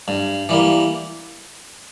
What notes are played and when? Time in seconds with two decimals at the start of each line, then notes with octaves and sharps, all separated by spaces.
0.08 G2
0.49 E3 G3 A#3